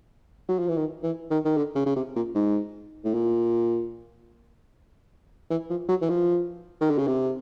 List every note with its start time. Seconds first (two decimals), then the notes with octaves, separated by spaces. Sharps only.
0.49 F#3
0.59 F3
0.68 E3
0.77 D#3
1.03 E3
1.30 D#3
1.45 D#3
1.57 D3
1.75 C#3
1.86 C#3
1.96 C3
2.16 A#2
2.35 G#2
3.05 A2
3.14 A#2
5.50 E3
5.70 F3
5.89 F#3
6.02 E3
6.09 F3
6.81 D#3
6.90 D3
6.98 C#3
7.07 C3